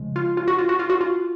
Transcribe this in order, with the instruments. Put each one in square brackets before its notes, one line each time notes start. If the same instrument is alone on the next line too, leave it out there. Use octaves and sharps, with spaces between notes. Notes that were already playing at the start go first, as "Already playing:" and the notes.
Already playing: [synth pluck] C#3 F3 G#3
F4
F4
F#4
F4
F#4
F4
F#4
F4